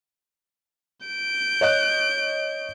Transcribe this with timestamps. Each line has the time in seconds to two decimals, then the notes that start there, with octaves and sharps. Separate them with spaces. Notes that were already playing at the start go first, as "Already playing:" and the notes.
1.06 G6 D7
1.61 C#5 D#5 F#6